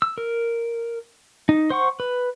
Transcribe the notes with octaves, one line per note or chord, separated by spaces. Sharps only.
E6
A#4
D#4
C5 F#5 C#6
B4